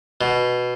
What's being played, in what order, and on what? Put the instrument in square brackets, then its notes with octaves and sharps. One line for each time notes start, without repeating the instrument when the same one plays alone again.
[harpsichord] B2